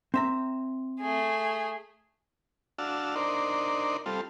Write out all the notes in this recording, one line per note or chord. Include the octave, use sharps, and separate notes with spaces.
C4 E5 A#5
A3 G#4
D4 F#4 F5 A5 E6
D4 D#4 A#4 C5 D5
G3 C4 F4 A4